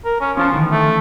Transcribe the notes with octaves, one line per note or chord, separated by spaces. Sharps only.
A#4
C#4
F3 C#4 F4 A5
D2 D#3 E3
A3